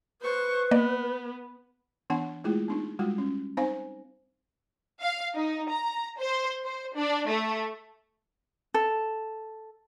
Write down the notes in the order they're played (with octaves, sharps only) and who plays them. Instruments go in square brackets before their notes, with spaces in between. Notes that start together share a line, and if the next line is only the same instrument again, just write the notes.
[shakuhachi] B4 [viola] C5 C#6
[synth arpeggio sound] A#3 D5 D#5 [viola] B3
[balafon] E3 B3 D4 F#5
G#3 A3 E4 F4 G#4
B3 D4 D#4
G3 G#3 F4 F#4
C#4
C4 D#4 C5 F5 G#5
[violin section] F5
D#4
A#5
C5
C5
D4
A3
[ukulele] A4